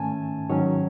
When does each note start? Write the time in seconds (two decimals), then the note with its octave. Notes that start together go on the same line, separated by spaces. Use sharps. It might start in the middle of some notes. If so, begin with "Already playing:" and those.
Already playing: G#2 D#3 A3 C#4 G#5 A5
0.50 G#2 D#3 F#3 C#4 C#5